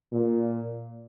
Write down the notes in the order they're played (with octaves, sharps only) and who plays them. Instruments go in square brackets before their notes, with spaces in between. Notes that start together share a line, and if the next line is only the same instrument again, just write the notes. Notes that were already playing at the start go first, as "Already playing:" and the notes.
[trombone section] A#2